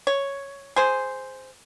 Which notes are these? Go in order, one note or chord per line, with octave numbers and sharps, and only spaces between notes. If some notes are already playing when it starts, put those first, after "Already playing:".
C#5
G#4 C5